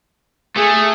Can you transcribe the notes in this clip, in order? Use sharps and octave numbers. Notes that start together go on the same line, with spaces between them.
A3 G#4